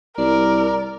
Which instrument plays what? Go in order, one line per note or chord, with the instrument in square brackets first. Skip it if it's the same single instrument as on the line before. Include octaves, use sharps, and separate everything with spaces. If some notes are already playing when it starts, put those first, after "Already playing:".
[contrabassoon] C2 [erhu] A#4 [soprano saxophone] D5